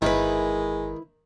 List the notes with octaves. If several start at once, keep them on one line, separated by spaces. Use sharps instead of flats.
G1 D#3 G#3 E4 B4